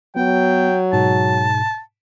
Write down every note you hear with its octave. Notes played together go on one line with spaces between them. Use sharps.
F#3 B3 G5
G#2 B2 A5